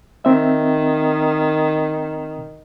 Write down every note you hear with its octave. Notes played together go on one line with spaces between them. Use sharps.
D#3 C4 E5